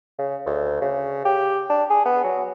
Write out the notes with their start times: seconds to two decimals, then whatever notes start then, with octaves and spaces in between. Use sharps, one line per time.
0.19 C#3
0.46 D2
0.81 C#3
1.25 G4
1.70 D4
1.90 G#4
2.05 B3
2.24 F#3